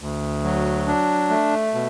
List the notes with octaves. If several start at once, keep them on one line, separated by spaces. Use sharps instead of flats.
D2
F#3
D4
A3
B2